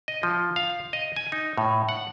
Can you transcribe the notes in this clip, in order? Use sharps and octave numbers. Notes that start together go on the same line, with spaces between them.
D#5
F3
F5
D#5
G#5
D#4
A2
F#5